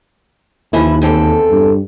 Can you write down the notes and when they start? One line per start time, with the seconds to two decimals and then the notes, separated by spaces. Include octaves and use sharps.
0.73 D#2 E3 F3 E4
1.02 E2 C4 A4
1.51 G2